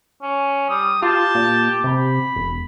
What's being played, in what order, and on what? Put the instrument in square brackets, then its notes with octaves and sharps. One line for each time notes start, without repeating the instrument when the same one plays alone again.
[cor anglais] C#4
[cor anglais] G3 [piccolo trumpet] D#6
[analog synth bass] F4 [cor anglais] G4 [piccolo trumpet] A5
[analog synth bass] A#2
[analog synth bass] C3 [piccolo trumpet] B5
[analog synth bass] E1